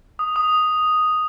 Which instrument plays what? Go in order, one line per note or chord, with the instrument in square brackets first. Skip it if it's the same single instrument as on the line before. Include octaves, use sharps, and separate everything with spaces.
[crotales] D#6
D#6